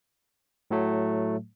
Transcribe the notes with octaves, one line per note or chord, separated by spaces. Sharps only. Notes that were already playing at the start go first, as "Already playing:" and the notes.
A2 F#3 A3